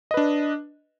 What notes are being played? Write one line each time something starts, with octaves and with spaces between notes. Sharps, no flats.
D4 B4 D#5